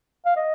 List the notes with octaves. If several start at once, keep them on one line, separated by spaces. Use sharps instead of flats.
F5
D#5